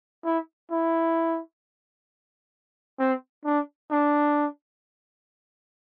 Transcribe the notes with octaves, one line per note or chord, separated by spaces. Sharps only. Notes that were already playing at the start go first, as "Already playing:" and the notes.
E4
E4
C4
D4
D4